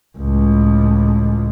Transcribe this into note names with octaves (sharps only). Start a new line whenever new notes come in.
C#2 A2